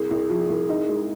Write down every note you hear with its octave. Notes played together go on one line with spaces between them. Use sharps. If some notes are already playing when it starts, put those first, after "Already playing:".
Already playing: C2 G#4
C2
F3
C2
D#4
G#3